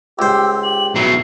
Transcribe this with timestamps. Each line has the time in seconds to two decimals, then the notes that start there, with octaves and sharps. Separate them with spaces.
0.19 C#2 G4 C5 E6
0.63 G4 F#7
0.95 B2 F#3 E4 C7